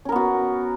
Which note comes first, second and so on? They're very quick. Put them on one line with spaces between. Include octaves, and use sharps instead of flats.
C#4 A#4 B3 F#4